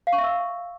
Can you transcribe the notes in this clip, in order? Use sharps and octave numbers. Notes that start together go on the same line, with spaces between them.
F5
C#6
E5
E6